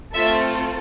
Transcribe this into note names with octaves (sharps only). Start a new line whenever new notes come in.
A3 C4 F4 A4 E5